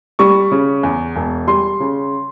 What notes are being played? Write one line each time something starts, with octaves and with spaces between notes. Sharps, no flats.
G3 C#6
C#3
E2
E1
G3 C6
C#3